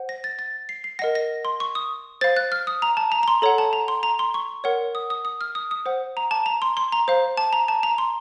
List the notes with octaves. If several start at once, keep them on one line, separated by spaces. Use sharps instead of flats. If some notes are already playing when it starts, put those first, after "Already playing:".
Already playing: C5 F#5
A#6
A6
A6
C7
C7
A#4 D#5 F#5 A#6
A#6
C6
C#6
D#6
C5 F5 A6
F#6
F6
D#6
A#5
A5
A#5
A#5
C6
A4 C#5 F#5 A#5
A5
A#5
C6
A#5
C6
C#6
A#4 C#5 F#5
D#6
D#6
D#6
F6
D#6
D#6
C5 F#5
A#5
A5
A#5
C6
C6
A#5
C5 F5
A5
A#5
A5
A#5
C6